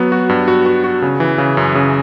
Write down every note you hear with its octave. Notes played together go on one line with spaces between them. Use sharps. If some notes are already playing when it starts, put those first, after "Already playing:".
Already playing: F#3 B3 F#4
F#4
G2
F#4
F#4
F#4
C#3
E3
C#3
F#2
C#3